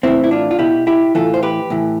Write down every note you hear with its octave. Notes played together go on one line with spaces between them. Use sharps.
A2 E3 C4 E4
E4
D4 F4
F4
B2 E4 G4
E4 G4
A2 E3 F4 A4
C5
G4 B4
A2 E3